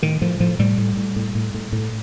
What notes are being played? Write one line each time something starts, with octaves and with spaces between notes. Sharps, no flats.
A2 D#3
A2 F3
A2 F3
A2 G3
A2
A2
A2
A2
A2
A2